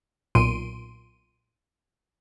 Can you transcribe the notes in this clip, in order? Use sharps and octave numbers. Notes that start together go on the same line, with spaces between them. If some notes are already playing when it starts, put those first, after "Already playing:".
B1 A#2 C6 D7 D#7